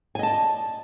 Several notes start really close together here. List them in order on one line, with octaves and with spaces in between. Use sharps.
G#5 D#5 A5 D5